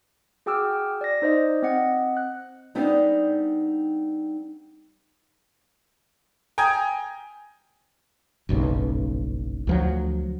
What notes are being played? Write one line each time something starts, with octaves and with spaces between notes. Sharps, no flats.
F#4 G#4 G5 D6 E6 F6
D5 A#6
D#4 C5 D5 D#5
C4 D#5 F#5
F#6
G3 B3 C4 D4 D#4 G#4
G5 G#5 A#5 D#6 G#6
F#1 B1 G2 C#3
D2 F3 F#3